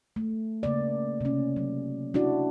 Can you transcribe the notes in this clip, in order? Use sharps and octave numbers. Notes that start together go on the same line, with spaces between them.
A3
C#3 A#3 D5
C3 C#4
F#3
D4 E4 F#4 D5